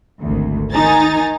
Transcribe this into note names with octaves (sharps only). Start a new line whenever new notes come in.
G#1 D2
D#3 D#4 G#5 A#5 A6